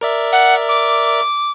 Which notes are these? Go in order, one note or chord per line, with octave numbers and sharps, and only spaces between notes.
A#4 D5 E5
F#5
D6